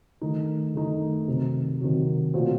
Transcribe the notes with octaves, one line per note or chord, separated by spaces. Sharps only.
D#3 A3 D#4
D#3 A3 D#4
C3 D#3 F#3
C3 D#3 F#3
A#2 F#3 A3 C4 F#4